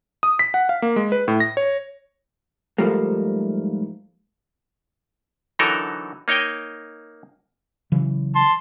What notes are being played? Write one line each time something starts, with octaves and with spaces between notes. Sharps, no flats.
D#6
B6
F#5
F5
A#3
G#3
B4
A2
A#6
C#5
G#2 F3 G3 A3 A#3
D3 E3 F#3 D#4 A4 A#4
A#3 D#4 C#5 D#5 G5
C#3 E3 F#3
A5 C6